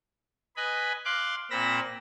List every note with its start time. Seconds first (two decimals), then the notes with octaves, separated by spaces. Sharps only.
0.56 B4 D#5 G#5 B5
1.05 F5 C6 D6 F#6
1.51 A#2 C4 B5 E6 A#6